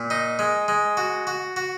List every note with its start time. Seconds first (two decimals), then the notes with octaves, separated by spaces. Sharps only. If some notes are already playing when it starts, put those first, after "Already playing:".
Already playing: A#2
0.10 D#4
0.39 G#3
0.68 G#3
0.97 F#4
1.27 F#4
1.56 F#4